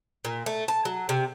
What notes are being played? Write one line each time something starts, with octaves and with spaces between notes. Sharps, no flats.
A#2
A3
A5
F#3
C3